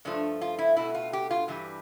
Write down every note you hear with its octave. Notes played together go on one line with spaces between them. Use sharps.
G2 F3 A3 D4
F4
E4
B2 A3 E4
F4
G4
F4
G2 E3 G3